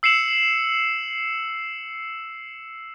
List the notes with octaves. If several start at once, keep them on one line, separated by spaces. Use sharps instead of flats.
E6 C7 C#7 E7 F#7